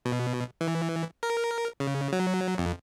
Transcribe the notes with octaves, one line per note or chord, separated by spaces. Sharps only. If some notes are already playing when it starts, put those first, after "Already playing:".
B2
E3
A#4
C#3
F#3
F2